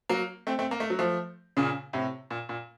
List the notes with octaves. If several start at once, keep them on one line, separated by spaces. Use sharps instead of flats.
F#3 A#3
A3 C4
A3 C4
A#3
A3
F#3
F3 A3
A#2 C#3
A2 C3
A#2
A#2